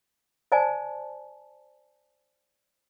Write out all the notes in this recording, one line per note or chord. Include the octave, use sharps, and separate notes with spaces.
C5 D5 G#5 A5